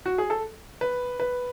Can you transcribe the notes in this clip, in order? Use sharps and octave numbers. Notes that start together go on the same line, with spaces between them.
F#4
G#4
A4
B4
B4